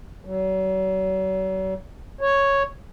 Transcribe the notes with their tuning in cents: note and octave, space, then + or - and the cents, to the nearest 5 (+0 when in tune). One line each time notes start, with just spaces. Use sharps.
F#3 +40
C#5 +0